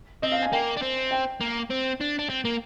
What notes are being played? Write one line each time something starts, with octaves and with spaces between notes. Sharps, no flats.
C4 D#5
F5
G#5
A#3 G5
D4
C4
G5
A#3
C4
D4
D4
C4
A#3